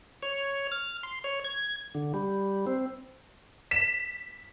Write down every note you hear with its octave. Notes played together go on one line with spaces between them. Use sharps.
C#5
F6
C6
C#5
G#6
D3
G3
C4
B6 E7